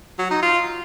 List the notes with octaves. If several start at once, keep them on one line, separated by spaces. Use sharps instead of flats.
F#3
D#4
F4